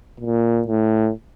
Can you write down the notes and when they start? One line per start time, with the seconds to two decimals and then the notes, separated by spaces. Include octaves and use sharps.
0.20 A#2
0.68 A2